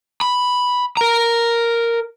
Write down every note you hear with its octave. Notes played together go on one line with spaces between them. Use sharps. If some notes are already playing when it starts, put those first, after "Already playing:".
B5
A#4 A#5